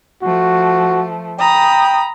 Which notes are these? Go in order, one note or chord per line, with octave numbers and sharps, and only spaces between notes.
F3 A3 F#4
G5 A#5 B5 D#6